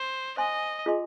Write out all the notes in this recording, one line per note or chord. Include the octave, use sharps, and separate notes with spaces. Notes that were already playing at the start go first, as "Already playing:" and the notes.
Already playing: C5
C5 D#5 F5 G#5 C6
F4 G#4 D#5 G#5 C6